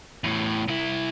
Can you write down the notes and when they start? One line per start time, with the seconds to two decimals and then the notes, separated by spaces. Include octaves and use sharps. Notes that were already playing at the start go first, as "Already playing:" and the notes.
0.24 E2 A2
0.68 C2 E4